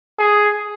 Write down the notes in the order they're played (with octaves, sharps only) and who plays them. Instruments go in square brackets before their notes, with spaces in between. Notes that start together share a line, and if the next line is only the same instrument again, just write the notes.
[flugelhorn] G#4